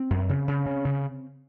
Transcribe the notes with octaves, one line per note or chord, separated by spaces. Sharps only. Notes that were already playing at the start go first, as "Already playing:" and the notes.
Already playing: C4
F#2
C#3
C#3
C#3
C#3